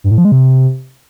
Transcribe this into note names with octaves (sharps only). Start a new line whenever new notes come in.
G2
A2
F3
G#3
C3